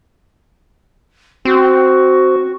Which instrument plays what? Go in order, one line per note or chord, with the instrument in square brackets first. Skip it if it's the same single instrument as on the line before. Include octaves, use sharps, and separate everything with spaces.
[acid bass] C4 [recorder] F#4